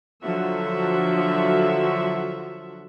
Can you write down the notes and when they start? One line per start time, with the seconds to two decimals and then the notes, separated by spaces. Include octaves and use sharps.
0.23 D3 F3 F#3 F#4 E5